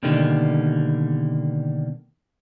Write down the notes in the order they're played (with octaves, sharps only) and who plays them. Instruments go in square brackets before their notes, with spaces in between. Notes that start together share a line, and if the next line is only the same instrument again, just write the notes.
[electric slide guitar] B2 D3 D#3 G3 A#3